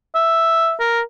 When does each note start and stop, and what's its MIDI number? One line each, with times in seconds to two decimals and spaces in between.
0.15 0.75 76
0.80 1.01 70